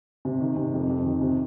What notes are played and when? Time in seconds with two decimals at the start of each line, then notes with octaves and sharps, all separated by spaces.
0.25 C3
0.41 D#3
0.56 C3
0.74 F2
0.89 F2
1.05 D#3
1.21 C3